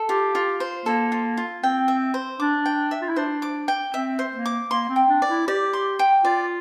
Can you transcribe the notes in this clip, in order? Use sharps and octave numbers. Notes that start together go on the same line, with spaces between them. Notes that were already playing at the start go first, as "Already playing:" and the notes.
Already playing: A4
F4 G4
F4
C5
A#3 A4
F4
F4
C4 G5
E5
C5
D4 D6
G5
E5
F4
E4
D4 C5
D6
G5
C4 E5
C5
A#3
D6
A#3 C6
C4
G5
D4
D5
E4
G4 D5
C6
G5
F4 D5